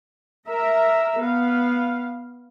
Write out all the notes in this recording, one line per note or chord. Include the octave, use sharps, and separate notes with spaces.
A#4 E5 A#5
B3 F5